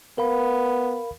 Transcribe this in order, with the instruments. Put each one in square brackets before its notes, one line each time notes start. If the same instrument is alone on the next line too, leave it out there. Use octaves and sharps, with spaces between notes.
[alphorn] B3 [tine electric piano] A#4 F5 B5